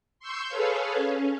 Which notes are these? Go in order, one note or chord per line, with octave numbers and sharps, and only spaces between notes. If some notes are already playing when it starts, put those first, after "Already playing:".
C6 C#6 E6 G6
G#4 A4 B4 C#5 F5
C#4